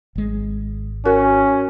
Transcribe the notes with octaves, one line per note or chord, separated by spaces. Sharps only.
G#1 G#3
C#4 F#4 A#4